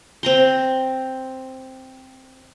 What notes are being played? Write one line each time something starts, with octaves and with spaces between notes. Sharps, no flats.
C4 A#5 C6